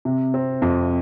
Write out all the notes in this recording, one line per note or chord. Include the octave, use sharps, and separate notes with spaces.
C3
C4
F2